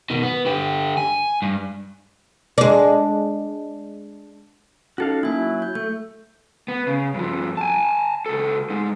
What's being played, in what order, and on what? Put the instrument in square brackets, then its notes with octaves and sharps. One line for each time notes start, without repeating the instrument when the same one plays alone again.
[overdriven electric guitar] B2 D#3
B3
D3 G4
G#5
G2
[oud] G#3 D4
[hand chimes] C#4 D#4 [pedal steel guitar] F#4 A4 F5
[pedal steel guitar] F#3 E4 [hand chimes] A#3 G#5
[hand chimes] G6
[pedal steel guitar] A3 [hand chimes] G6
[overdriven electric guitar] B3
C#3
G2 F3
G#5 A5
C#2 A4
G#3 D#4